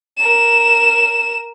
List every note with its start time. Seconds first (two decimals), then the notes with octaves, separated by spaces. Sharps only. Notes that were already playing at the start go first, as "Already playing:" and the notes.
0.18 A#4 E7